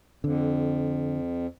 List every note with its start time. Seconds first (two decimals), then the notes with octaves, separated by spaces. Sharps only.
0.24 F2 D3